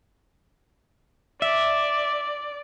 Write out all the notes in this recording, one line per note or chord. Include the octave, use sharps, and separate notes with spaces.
D5 E5